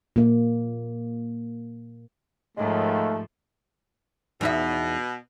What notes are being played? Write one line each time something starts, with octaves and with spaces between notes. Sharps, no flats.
A#2 A#3
D#2 G#2 F3 G#3 A3
E2 B2 D#4 E5